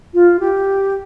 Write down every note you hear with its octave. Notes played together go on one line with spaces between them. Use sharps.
F4
G4